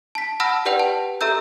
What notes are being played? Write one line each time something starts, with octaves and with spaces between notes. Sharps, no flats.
A5 B6
F#5 A5 B5 E6 F6 A#6
G4 B4 D5 F#5 G5 F7
A5
G4 A4 E5 A#5 E6 G6